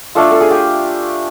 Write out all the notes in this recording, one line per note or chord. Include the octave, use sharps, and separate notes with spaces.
A3 D4 F4 A4
A4
G#4
G4